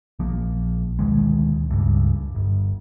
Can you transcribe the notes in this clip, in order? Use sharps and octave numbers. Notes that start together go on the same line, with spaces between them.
A#1 F3 A#3
D2 B2 D#3 G#3
C#2 G2
G1